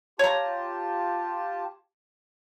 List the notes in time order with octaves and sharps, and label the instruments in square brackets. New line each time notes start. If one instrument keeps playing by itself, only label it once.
[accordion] F4 G4 A5 [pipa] C#5 A#5